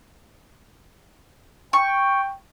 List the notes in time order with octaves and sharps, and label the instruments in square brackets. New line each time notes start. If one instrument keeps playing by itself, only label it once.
[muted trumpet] G5 [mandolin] C#6